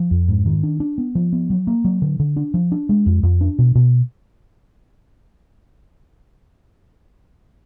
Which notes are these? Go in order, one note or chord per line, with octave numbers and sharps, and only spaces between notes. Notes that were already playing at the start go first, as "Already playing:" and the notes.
Already playing: F3
F2
G#2
D#3
D4
D4
B3
F3
B3
F#3
A#3
F#3
D3
D3
D4
F3
D4
G#3
F2
F2
D4
B2
B2